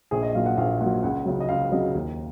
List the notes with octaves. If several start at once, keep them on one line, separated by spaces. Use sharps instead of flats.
A#1 G#4
D#5
A#2 F#3 F5
F#5
A#1 F5
A#2 F#3 F#5
C#2 F#5
C#3 F#3
D#5
C#2 F5
C#3 F#3 D#5
D#2